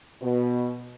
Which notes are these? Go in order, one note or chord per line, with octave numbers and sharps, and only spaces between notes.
B2